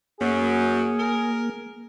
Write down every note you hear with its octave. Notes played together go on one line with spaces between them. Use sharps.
F#2 A#3 G#4
A#4